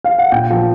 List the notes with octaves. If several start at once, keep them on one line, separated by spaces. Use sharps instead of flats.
F5
F#5
A#2 G5
F3